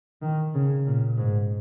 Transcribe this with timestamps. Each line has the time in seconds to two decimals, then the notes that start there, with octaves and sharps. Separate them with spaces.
0.22 D#3
0.55 C#3
0.87 A#2
1.18 G#2